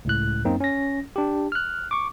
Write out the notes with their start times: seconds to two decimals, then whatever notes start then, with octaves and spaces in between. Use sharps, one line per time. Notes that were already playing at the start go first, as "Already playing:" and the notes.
0.05 C#2 A2 F#6
0.45 F#2 A#3 C4 D#4
0.60 C#4 A#6
1.16 D4 G4
1.52 F6 F#6
1.91 C#6 D6